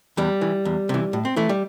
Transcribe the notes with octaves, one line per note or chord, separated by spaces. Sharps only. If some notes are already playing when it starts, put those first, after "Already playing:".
E2 G3
E3
E2
C3 E3
A2
C4
E3 A3
G3